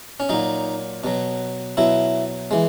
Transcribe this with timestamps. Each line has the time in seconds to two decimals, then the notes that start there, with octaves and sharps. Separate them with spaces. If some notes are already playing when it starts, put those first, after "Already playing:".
0.20 C#4
0.29 A#2 F#3 D#4
1.04 B2 F#3
1.77 B2 F#3 E4
2.51 E3 G#3